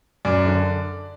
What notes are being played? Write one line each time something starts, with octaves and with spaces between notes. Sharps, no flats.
F#2 D5
D3